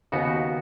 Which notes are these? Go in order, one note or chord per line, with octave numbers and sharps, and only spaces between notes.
D#2 C#3 B3 D#4 F#4